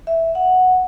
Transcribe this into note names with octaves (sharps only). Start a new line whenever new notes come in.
E5
F#5